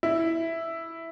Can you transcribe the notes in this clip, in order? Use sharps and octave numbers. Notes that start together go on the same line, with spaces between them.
E4